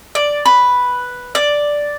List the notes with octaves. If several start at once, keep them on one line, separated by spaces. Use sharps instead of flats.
D5
B4
D5